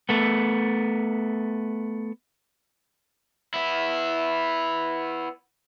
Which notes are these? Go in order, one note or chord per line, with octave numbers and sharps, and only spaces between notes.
A3 B3
B3 E4